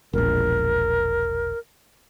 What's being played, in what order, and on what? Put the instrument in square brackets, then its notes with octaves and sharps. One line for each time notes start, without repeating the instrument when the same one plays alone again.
[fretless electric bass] E1 A#1 [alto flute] A#4